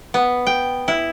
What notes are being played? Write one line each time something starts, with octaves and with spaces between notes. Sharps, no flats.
B3
G5
E4